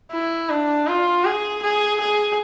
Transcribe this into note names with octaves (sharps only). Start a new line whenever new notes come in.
E4
D4
F4
G#4
G#4
G#4